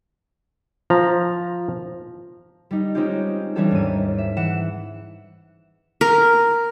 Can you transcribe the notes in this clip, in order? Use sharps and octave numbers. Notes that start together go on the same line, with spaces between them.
F3 A#5
G3 D#4
G#3 C4 C#4 D#4 F4 G4
E3 G3 C#4 D4 G4 A4
D#2 G#2 C4 D#7
E5
E3 F#5 E7
A#4